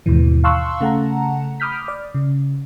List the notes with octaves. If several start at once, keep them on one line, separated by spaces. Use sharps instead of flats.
D#2 G#2 B2 E3
F5 A5 C6 C#6 E6 F#6
C#3 A3 F#5 A5 A#5
B5 D6 D#6 F6 G6 B6
D5
C#3